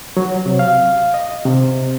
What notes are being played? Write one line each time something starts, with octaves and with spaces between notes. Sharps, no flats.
F#3
C3
F5
D#5
C3